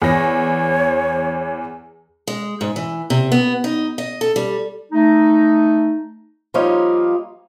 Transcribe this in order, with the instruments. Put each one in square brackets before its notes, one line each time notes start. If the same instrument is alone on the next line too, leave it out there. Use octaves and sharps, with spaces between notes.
[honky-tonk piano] E2 A#6 [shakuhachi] C#5
[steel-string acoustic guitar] G#3
G#2
E3
C3
B3
D#4
D#5
A4
G3
[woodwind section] A3 D#4
[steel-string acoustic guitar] F3 G3 A#3 D#4 F4 C#5